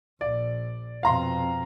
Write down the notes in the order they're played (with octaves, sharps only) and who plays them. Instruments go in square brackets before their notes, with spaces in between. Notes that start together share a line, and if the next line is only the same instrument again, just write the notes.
[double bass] A#1 [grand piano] D5
[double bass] F2 B2 [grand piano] F5 A#5 C6